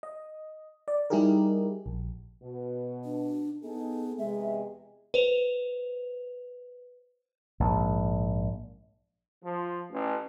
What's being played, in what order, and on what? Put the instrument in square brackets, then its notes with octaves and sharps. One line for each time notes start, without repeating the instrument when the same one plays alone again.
[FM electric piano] D#5
D5
G3 D#4 E4 G4 G#4 A#4
A#1
[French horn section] B2
[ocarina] D4
[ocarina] B3 [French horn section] D#4 G#4 A4
[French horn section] E2 C3 G#3 [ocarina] E5
[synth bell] B4 C5 F7
[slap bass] A#1 G#2
[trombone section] F3
A1